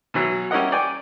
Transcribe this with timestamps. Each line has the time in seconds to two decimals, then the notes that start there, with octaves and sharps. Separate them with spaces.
0.14 B2 E3 F#3
0.51 G3 C#4 E4 A#4 D#5 F#5
0.72 D5 G5 G#5